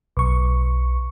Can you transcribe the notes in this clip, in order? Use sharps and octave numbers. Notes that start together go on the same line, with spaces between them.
B1 C#6